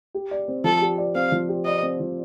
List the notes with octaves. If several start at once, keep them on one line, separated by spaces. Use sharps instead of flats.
G4
D5
C4
F3 A4
G4
D5
C4 F5
F3
G4
D5 D#5
C4
F3